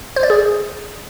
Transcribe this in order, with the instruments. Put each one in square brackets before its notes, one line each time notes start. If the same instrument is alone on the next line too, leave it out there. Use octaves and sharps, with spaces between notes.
[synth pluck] C5
D5
G#4